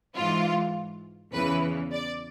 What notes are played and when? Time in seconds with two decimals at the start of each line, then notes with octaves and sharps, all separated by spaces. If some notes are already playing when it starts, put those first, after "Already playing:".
0.15 G#2 E3 F4
1.33 E2 C#3 E3 B4
1.91 D5